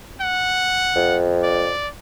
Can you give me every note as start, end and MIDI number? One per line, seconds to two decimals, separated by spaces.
0.21 1.17 78
0.96 1.73 41
1.43 1.88 74